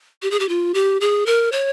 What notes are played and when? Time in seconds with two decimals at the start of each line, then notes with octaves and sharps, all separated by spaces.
0.22 G4
0.31 G#4
0.40 G4
0.49 F4
0.74 G4
1.01 G#4
1.26 A#4
1.52 C#5